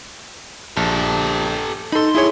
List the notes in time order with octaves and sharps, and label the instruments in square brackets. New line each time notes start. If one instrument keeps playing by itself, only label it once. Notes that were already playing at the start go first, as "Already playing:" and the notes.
[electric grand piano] A#1 [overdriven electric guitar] G4 A4
[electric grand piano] D#4 A4 [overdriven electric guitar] B5 C6
[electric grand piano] E4 G#4 C#5